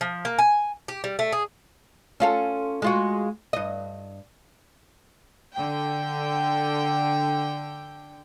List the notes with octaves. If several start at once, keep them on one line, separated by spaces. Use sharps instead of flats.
F3
A#3
G#5
G4
G3
A3
G#4
C#4 F4 A4
G#3 F4 F#4
G2 D#5
D3 G5